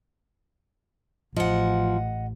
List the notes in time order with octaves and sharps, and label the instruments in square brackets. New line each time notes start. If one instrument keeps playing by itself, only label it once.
[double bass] A1 [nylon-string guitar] F3 [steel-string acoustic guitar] D#5 F#5